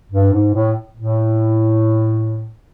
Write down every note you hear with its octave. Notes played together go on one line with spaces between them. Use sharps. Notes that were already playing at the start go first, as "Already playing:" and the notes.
G2
G#2
A2
A2